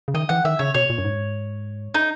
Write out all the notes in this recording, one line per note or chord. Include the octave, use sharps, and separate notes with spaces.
C#3
D#3 D#5
E3 F#5
D#3 E5
C#3 C#5
B2 C#5
A#2
F#2
G#2
D#4